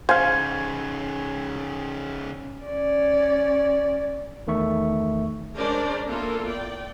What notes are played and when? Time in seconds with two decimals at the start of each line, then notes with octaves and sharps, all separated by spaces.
0.09 C#3 D#4 C5 F5 G#5
2.65 C#4 D5
4.47 E2 D#3 A3 E5 C#6
5.56 G#3 C#4 D4 A#4 C5 D5
6.07 A#3 B3 E4 F4 A4 A#4
6.46 D5 G5